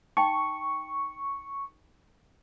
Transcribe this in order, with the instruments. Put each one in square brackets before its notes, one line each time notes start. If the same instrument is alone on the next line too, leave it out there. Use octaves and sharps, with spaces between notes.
[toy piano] D#4 G5 [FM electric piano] C#6